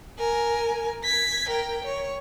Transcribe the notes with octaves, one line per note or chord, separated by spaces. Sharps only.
A#4 G#5
G#6 B6
A#4 G5
C#5